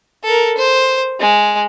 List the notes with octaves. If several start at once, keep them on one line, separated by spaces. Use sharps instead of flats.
A4 A#4
C5
G#3